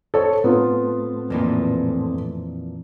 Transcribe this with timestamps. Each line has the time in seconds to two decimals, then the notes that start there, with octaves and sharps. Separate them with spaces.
0.14 A4 C5 C#5
0.44 A2 A3 B3 C4 F4
1.30 F2 A#2 E3